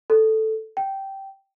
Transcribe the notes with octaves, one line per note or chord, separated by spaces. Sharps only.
A4
G5